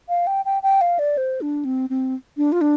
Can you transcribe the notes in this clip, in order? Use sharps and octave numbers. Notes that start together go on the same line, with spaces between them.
F5
G5
G5
G5
F5
D5
C5
D4
C4
C4
D4
F4
D4